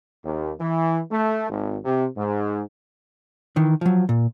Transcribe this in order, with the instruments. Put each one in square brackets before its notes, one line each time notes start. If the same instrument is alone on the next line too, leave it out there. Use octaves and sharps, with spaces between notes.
[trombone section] D#2
E3
A3
G#1
C3
G#2
[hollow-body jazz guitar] D#3 E3
F3 F#3
A#2